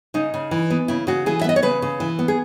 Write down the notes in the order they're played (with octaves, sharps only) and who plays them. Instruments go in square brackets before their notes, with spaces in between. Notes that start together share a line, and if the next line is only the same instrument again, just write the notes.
[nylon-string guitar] C#3 D#4
C#3
E3
B3
C#3 E4
C#3 F#4
E3 G#4
E5
B3 D#5
C#5
C#3 B4
C#3
E3
B3
G#4